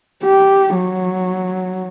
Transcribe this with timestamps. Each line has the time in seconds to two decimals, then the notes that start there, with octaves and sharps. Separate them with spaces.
0.24 G4
0.76 F#3